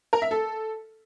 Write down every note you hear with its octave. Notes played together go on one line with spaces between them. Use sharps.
A#4
E5
A4